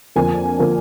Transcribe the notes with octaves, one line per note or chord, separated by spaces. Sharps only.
F2 D3 F3 A#3 G#5
D3 F3 A#3